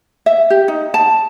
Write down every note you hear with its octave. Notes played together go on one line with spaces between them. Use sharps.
E5
G4
D#4
A5